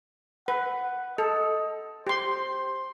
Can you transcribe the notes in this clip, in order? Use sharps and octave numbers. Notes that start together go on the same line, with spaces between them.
B4 F#5
A4 D#5
G4 C5 C6